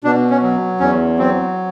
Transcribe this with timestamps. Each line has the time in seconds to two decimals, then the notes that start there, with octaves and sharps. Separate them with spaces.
0.04 B2 D4
0.30 C#4
0.43 F#3
0.80 E2 C#4
1.18 F#3 C4